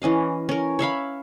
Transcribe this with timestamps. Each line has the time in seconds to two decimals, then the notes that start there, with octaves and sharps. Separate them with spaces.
0.02 E3 C#4 D#5 F5
0.49 C#4 A#4
0.79 C#5 E5 F5 B5